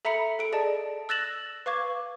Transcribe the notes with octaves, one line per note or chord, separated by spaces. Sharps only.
A4 E5 A#5 B5 C#7
A4 D7
G#4 D5 D#5 A5
E6 F#6 A6 A#6 E7 F#7
B4 F5 C#6 D6 G#6